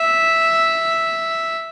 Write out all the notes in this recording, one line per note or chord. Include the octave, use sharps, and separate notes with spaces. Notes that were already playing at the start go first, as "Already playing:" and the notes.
Already playing: E5